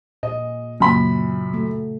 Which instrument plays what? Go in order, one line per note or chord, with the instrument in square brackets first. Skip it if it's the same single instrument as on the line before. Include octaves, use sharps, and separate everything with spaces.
[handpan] A#2 G#4 [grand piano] D#5
[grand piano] F#2 A#2 B5 [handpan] C#3
[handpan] A3 F#4